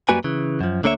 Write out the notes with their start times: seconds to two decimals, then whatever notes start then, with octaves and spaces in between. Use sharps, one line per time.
0.09 F#2 G3 A#3 F#4 B4 G#5
0.24 C#3 E3
0.61 F#2 F3
0.83 D2 D3 A#3 C#5 E5